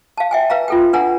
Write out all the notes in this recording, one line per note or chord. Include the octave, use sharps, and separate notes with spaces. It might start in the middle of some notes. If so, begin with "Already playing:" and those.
F5 A5
E5 G5 G#5
B4 F5 A#5
F4 A4 G5
D4 B4 F#5 G#5 A#5